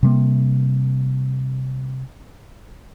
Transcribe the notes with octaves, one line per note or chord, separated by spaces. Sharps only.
C3 G3 G#3 A#3